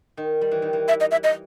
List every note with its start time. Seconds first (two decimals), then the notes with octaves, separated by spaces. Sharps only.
0.17 D#3
0.41 G3
0.51 E3
0.62 D#3
0.73 E3
0.88 E5
1.01 D#5
1.11 E5
1.24 D#5